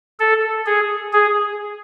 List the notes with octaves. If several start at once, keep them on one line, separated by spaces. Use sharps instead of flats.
A4
G#4
G#4